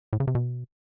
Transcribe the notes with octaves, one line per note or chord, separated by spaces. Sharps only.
A2
C#3
C3
B2